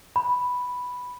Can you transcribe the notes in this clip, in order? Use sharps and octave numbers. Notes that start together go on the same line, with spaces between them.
B5